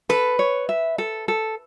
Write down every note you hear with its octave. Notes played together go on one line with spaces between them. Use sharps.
A4 B4
C#5
E5
A4
A4